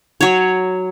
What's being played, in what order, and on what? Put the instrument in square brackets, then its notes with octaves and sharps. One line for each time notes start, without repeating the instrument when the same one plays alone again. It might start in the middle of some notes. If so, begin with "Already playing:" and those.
[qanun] F#3 C#5